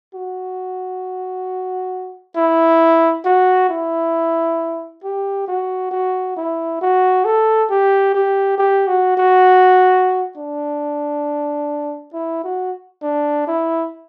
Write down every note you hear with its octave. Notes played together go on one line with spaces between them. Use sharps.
F#4
E4
F#4
E4
G4
F#4
F#4
E4
F#4
A4
G4
G4
G4
F#4
F#4
D4
E4
F#4
D4
E4